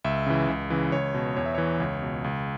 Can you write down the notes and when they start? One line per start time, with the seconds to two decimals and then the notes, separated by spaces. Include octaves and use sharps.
0.04 C#2 E5
0.27 C#3 E3
0.48 C#2
0.70 C#3 E3
0.92 C#2 C#5
1.14 B2
1.36 E2 C#5
1.46 E5
1.55 E3 C#5
1.80 C#2
2.02 B2
2.24 C#2